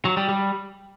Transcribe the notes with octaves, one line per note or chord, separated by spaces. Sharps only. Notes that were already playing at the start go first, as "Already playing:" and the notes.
F#3
G3
G3